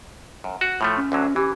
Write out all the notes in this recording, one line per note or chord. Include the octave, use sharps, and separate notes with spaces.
F#2
F#4
A2 F3 A3
C#4
D2 D3 F#3
E3 G4